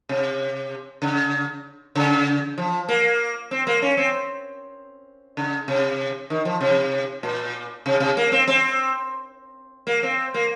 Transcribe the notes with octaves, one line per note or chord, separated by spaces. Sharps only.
C3
C#3
C#3
F3
A#3
C4
A#3
C#4
C4
C#3
C3
D#3
F3
C3
A#2
C3
C3
A#3
C4
C4
A#3
C4
A#3